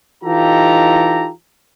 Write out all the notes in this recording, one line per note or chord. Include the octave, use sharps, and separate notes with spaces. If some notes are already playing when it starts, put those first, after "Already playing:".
E3 D#4 F4 G4 A4 A#5